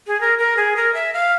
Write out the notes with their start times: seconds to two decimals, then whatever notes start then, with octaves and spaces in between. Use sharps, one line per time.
0.07 G#4
0.21 A#4
0.39 A#4
0.57 G#4
0.76 A#4
0.94 E5
1.14 F5